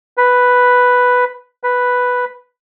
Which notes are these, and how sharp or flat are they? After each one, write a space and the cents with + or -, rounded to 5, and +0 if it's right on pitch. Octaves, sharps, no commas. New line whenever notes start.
B4 +0
B4 +0